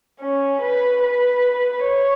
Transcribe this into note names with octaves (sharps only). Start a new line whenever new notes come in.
C#4
B4
B4
C#5